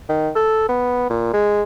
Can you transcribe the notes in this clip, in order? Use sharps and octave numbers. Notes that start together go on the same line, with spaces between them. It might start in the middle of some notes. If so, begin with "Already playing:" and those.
D#3
A4
B3
A#2
G#3